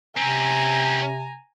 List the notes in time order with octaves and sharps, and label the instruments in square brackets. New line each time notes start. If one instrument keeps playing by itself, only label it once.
[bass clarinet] C3 [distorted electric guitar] C4 C#4 [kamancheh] G#5 A#5